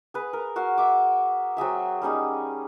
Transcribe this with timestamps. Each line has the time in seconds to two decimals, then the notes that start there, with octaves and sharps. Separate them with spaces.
0.14 G#4 B4
0.33 A#4
0.56 F#4 A#4 F5
0.78 E5 D6
1.57 F#3 C4 G#4 E5
2.02 G3 C#4 D#4 G#4